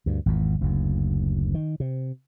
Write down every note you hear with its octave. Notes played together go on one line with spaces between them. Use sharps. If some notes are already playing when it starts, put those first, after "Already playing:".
D2 G2
G#1 E2
F#1 D2
D#3
C3